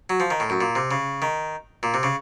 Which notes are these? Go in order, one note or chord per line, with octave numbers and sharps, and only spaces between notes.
F#3
F3
D#3
A2
F#2
A#2
C3
C#3
D#3
A#2
C3
C#3